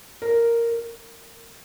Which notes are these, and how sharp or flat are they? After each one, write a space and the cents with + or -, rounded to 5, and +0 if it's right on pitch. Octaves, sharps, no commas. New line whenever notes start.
A#4 -5
A#4 -25